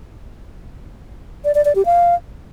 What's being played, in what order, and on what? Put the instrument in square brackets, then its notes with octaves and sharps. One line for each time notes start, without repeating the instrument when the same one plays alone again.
[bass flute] D5
D5
D5
G4
F5